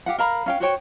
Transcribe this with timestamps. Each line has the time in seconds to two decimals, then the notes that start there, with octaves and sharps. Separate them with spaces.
0.06 G4 F5 F#5
0.18 A#4 F5 A#5 B5
0.46 C#4 F5 G5
0.60 F#4 C5 C#5 G5